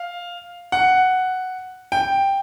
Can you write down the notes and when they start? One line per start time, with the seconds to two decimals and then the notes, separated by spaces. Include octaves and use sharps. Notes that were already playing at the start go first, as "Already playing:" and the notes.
Already playing: F5
0.72 F#5
1.92 G5